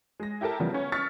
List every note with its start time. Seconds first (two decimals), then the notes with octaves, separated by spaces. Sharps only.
0.20 G#3 A#6
0.41 E4 G4 A4 A#4 A5
0.60 C#3 E3 F3 G3 B3
0.74 B3 C#4 C#5
0.92 C#6 E6 F6 A6 B6 C#7